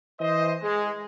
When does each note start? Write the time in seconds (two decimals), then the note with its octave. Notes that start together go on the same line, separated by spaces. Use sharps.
0.20 E3 C5 D#5
0.61 G#3